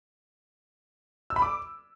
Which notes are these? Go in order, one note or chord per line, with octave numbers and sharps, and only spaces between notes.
E6
B5
D6